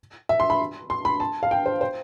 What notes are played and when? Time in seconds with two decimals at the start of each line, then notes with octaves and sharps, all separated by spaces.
0.29 E5
0.40 C6
0.50 B5
0.90 C6
1.05 B5
1.20 A5
1.43 F5
1.51 G5
1.66 C5
1.81 C5